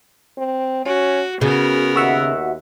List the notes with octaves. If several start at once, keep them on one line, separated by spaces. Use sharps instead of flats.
C4
C#4 F#4
C#3 B3 F#4 A#4
D#2 F#4 E5 F#5